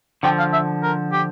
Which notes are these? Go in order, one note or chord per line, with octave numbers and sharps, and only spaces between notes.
D3 F3 G5
F5
E5
A#4
G4